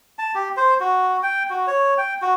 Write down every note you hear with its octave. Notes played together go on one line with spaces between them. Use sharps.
A5
G4
C5
F#4
G5
F#4
C#5
G5
F#4